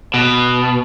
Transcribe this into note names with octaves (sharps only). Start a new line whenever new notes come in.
B2